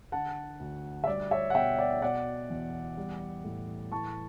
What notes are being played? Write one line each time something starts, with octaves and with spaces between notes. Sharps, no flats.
D3 F#5 A5
D2
E5
G3 D5
C#5 E5
F#5
B2 E5 G5
D5 F#5
B2 D5 F#5
E2
G3
A2
E3 A5 C#6